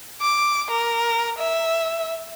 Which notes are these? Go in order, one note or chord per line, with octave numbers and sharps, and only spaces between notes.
D6
A#4
E5